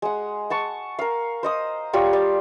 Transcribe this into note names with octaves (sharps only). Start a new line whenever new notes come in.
G#3 F#5
F#5 A5 C#6
A#4 F5
C5 D#5 D#6
G3 F4 G4 C#5
D5